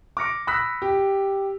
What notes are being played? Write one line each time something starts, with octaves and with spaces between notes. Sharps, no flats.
D6 F6 A#6 C#7 D7
B5 D#6 E6 F#6 A#6 B6
G4